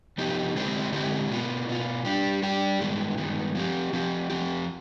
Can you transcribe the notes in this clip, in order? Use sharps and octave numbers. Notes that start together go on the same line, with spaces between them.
C3 F3 B3 D#4 G4
D3 G#3 C4 G4 C5
D3 G#3 C4 G4 C5
B2 B3 F4
B2 B3 F4
G3 D4 G4
G3 D4 G4
G2 D#3 G#3 B3
G2 D#3 G#3 B3
F3 C4 G4
F3 C4 G4
F2 C3 F3 C4 G4